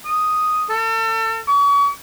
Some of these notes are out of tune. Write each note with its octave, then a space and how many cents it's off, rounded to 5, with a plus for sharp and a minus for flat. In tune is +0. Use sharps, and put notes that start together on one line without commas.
D#6 +0
A4 +35
C#6 +40